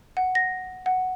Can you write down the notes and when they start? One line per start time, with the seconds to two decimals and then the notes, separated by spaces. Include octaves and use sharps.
0.17 F#5
0.35 A#6
0.86 F#5